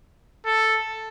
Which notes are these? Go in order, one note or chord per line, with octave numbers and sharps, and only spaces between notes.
A4